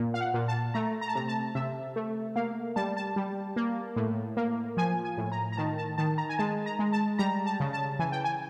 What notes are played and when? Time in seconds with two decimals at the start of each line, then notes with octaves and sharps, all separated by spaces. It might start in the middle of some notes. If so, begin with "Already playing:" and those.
Already playing: A#2
0.14 F5
0.21 F#5
0.34 A#2
0.48 A5
0.74 A3 A#5
1.01 A#5
1.08 A5
1.15 C3 A#5
1.28 A5
1.55 C3 E5
1.96 A3
2.36 A#3 F5
2.76 G3 A5
2.97 A5
3.16 G3
3.56 A#3
3.96 A2
4.37 A#3
4.77 F3 G#5
5.05 G#5
5.18 A2
5.32 A#5
5.52 A#5
5.57 D#3 A5
5.78 A5
5.98 D#3 A5
6.18 A#5
6.29 G#5
6.38 G#3 A5
6.66 A#5
6.79 G#3
6.92 A5
7.18 G3 A#5
7.46 A5
7.60 C#3
7.73 A5
7.99 E3 G#5
8.12 G5
8.24 G#5